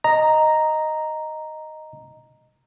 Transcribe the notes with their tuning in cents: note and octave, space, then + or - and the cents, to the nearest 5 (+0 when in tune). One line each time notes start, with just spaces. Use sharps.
D#5 +0 A#5 +0